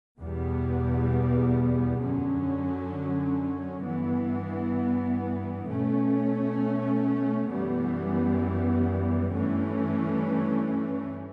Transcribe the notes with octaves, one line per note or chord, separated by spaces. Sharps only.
E2 B2 G3 B3
F#2 D3 F#3 C#4
G2 E3 B3
B2 A3 C#4
F#2 E3 G3 B3
G2 E3 A3 C#4